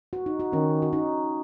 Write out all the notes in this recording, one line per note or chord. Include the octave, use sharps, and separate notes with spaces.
F#4
D#4
F#4
D#3 C#4
F#4
D#4